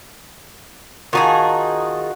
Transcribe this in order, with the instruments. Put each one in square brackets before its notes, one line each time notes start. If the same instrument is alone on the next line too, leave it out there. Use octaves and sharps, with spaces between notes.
[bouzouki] D#3 D#4 G#4 [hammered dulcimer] F4 F#4 A5